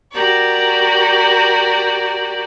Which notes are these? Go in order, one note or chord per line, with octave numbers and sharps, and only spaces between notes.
F#4 G4 A#4 D5